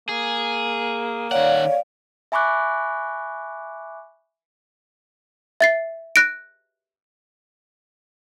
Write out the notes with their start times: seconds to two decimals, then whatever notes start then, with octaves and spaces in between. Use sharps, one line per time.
0.09 A#3 G#4
1.31 D#3 C#5 D5 F5 F#5
2.32 E5 G#5 B5 C#6 D6 F#6
5.61 E5 A6 C7
6.16 F#6 A#6 D7